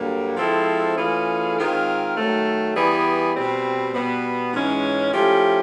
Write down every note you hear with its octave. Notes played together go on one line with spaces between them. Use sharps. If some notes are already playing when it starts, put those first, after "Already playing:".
Already playing: G2 D3 F#3 A#3
F3 G#3 C4 E4 A4
E3 A3 C#4 F4 G#4
D#3 G#3 C4 F4 A#4
D#3 F#3 A3
E3 G3 B3 E4 G#4
B2 G3 C4
B2 G3 B3
G#2 E3 G#3 C#4
F3 A3 C#4 E4 G4